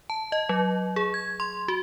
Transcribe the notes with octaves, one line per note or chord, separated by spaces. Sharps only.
A5
D#5
F#3
G#4
G#6
C6
F#4